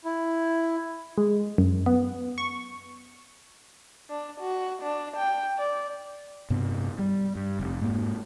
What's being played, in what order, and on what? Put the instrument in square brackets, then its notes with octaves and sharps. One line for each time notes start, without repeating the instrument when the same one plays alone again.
[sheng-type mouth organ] E4
[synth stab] G#3
F#2
B3
C#6
[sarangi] D4
F#4
D4
G5
D5
[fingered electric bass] G2 C3 B3
G3
G2
F1
G#2 A#3